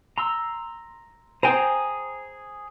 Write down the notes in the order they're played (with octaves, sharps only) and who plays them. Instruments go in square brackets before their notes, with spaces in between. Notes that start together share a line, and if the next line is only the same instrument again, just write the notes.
[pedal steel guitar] A#5 C6 E6
[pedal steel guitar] G#4 G#5 A#5 [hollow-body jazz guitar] C5 G5